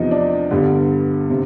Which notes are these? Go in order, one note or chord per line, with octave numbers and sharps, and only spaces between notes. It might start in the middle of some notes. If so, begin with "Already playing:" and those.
Already playing: E2 C3 F3 D#4
D4
G2 D3 G3 B3
C3